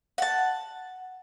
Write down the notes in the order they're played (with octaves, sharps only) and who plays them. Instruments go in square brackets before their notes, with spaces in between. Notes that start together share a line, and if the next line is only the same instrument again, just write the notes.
[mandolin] F#5 A5